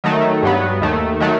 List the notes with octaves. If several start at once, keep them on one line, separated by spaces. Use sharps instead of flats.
D#3 F#3 A3 D#4
G2 F#3 B3
D#2 D#3 A3
D#3 F#3 A3